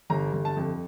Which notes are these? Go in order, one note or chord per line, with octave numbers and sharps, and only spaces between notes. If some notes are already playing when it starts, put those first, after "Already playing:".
G1 A#5
G1
A5
F2